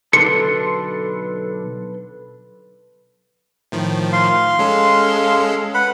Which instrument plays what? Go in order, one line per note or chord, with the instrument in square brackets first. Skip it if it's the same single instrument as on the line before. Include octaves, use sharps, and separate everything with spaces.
[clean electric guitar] B1 D3 D4 [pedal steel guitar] A4 B4 C6 [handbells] C#7
[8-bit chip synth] A2 D#3 F3
[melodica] F5 C6
[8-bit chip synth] G#3 C#4 A4
[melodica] B4 F#5 [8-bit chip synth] B5